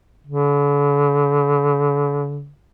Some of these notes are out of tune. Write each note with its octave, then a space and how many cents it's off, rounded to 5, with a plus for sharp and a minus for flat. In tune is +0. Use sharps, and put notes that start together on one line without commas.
D3 -45